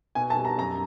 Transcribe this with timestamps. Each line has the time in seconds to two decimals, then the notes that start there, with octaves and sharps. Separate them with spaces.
0.15 B2 G#5
0.30 A5
0.37 G3
0.45 A#5
0.58 F#2 A#5